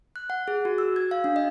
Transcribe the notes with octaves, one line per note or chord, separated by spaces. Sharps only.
F#6
F#5
G#4
F#4
E6
G#6
F5
D4
D#5